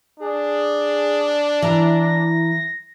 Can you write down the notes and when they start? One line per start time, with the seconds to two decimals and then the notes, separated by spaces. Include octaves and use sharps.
0.20 D4 G#4
1.62 E3 E4 A#5 A#6